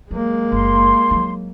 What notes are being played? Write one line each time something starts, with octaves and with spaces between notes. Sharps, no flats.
F#3 G#3 A#3
F#1 C6
F#3 D#4